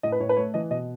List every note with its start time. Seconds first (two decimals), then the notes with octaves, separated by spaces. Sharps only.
0.03 A2 D#5
0.12 B4
0.20 A2 C#5
0.29 B4
0.37 A3 C#5
0.54 E3 D#5
0.71 B2 D#5